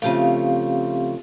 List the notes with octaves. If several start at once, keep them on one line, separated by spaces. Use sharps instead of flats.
C#3 F3 A3 C4 G4 F5